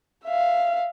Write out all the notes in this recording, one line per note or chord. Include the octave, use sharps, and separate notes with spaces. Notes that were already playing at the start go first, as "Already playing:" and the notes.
E5 F5